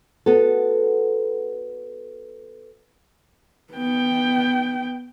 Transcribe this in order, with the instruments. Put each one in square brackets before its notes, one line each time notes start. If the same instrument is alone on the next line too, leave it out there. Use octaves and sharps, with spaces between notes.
[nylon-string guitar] B3 F#4 A4
[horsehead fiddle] B3 G5